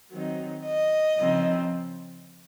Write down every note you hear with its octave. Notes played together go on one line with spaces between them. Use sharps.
D#3 F#3 C4 D#4
D#5
C#3 F3 C4 D#4